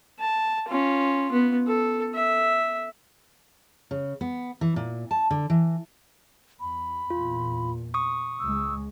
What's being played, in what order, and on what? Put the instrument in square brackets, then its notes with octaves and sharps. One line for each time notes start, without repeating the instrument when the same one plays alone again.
[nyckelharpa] A5
C#4 F4
B3
A4
E5
[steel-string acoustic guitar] C#3
B3
E3
A#2
A5
D3
E3
[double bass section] E2 [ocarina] B5
[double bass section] E2 A#2 [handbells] F4
[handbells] C#6 D#6
[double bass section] C#2 G#3 [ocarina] E6